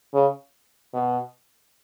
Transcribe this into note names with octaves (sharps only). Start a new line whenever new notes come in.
C#3
B2